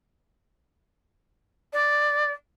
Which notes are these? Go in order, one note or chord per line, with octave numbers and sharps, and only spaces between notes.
D5